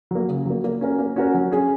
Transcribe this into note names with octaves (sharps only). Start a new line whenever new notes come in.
F#3 A#3
C#3
F#3 A#3
A#3
C#4 F#4 A#4
A#3
C#4 F#4 A#4
F#3
C#4 G#4